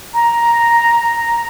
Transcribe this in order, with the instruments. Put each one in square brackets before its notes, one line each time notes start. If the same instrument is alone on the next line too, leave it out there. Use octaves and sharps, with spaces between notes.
[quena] A#5